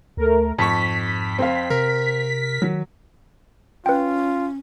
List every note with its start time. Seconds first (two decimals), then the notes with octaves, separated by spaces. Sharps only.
0.17 D2 A3 A#4
0.59 F2 G#2 A5 C#6 B6
1.39 C4 F5
1.70 C3 A#4
2.62 D#3 F#3
3.86 C#4 F4 B4 G5